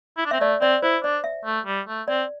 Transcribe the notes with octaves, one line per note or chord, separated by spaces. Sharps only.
E4
D4
C4 E5
A3 D5
C4 D5
E4 C5
D4 D5
E5
A3
G3
A3
C4 D5